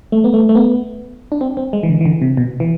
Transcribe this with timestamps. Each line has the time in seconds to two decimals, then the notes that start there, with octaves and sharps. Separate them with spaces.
0.12 A3
0.24 B3
0.34 A3
0.49 A3
0.55 B3
1.32 D4
1.41 C4
1.57 C4
1.73 G#3
1.83 E3
1.89 D3
2.01 E3
2.05 D3
2.22 C3
2.37 B2
2.60 E3